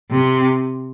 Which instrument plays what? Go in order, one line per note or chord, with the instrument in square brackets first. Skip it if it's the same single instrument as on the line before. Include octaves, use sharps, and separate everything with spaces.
[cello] C3